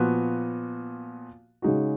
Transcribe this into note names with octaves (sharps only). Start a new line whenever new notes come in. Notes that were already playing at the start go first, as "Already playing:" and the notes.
Already playing: A#2 F3 B3 F#4
C#3 G#3 D#4 F#4